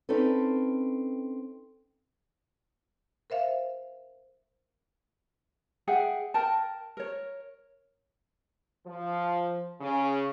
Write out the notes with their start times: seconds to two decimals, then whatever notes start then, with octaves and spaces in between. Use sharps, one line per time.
0.09 C4 C#4 D#4 A4 B4
3.30 A#4 C5 E5 F5
5.88 G#4 E5 F#5 G5
6.34 A#4 G5 A5
6.97 A#4 C#5
8.86 F3
9.81 C#3